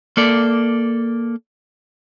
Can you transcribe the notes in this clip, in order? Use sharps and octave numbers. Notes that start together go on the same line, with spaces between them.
A#3 A4 D5